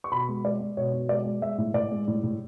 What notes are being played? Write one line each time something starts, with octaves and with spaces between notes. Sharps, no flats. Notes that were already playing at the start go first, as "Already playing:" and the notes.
C#6
B2 B5
G#3
G#3 D5
G#3
B2 C#5
B2
G#3 D5
G#3
G#3 E5
A2
A2 D5
G#3
A2
A2